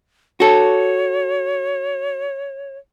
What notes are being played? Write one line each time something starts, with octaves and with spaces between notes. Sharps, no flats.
F#4 A4 C#5